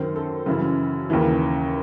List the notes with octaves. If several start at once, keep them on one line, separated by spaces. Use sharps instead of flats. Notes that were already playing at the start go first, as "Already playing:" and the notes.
Already playing: F#2 D#3 C5
A4
F#2 C#3 E3
D#2 C#3 E3